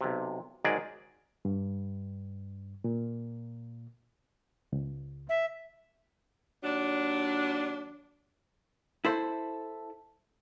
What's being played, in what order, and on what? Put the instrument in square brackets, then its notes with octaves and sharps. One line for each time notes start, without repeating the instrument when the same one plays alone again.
[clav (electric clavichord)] B1 C3
G#2 D#3 F#3 G#3 G#4 D5
[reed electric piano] G2
A#2
C#2
[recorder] E5
[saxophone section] D#2 F#3 D4
[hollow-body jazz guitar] E4 A4 C5